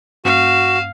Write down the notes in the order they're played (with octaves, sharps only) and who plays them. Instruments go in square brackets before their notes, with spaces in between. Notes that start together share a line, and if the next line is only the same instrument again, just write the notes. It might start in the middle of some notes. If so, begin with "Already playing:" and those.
[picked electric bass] G2 A#3 C#4 [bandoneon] F#4 [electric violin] F5 [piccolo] E7